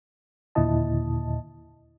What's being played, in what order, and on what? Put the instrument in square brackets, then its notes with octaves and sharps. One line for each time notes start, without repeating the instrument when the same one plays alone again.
[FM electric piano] D#2 A#2 D3 E4 D#5 A5